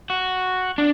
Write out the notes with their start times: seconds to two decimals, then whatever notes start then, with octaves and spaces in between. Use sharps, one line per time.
0.10 F#4
0.78 D4